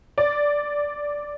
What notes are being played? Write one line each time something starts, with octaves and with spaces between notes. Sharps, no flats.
D5